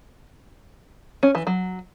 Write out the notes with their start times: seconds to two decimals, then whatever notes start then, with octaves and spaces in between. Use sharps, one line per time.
1.23 C#4
1.35 E3
1.47 F#3